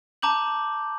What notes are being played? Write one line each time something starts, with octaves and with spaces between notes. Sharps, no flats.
A5 A#5 D6 G6 F#7